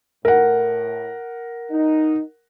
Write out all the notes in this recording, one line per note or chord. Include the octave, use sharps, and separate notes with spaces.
A2 A#4 F#5
D#4